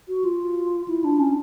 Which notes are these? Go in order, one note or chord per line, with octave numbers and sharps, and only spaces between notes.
F#4
F4
E4
D4
C#4